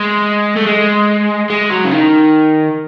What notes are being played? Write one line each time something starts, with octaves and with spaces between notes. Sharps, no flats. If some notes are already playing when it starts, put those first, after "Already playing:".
Already playing: G#3
A3
G#3
G#3
F#3
C#3
D#3